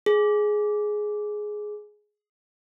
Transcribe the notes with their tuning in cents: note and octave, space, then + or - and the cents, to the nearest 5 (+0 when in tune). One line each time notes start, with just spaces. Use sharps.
G#4 +10